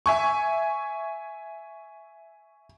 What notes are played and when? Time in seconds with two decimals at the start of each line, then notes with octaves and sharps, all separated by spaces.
0.06 E5 G#5 C#6